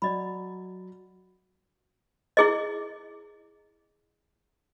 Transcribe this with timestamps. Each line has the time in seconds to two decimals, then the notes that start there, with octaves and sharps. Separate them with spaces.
0.02 F#3 D5 D#5 B5
2.37 E4 G#4 D#5